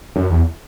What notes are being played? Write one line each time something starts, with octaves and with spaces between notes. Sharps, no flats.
F#2
E2